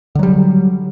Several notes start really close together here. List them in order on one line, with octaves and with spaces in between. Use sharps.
D3 F#3 G3